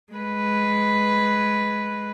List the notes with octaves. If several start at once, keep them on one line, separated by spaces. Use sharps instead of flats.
G#3 B4